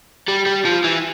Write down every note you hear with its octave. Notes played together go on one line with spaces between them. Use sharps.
G3
G3
F3
E3